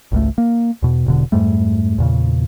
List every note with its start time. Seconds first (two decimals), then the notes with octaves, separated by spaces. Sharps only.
0.12 G#1 C#2 A3
0.38 A#3
0.82 E2 B2
1.06 E1 B2 D3
1.32 F2 G#2 G3 A3
1.98 E2 A#2 C#3